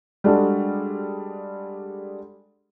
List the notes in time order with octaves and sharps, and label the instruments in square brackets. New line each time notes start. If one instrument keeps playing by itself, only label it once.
[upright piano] G3 G#3 D4 F#4 G#4 A4